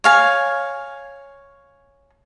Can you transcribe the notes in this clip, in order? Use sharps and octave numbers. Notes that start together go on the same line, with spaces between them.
C#5 F5 G#5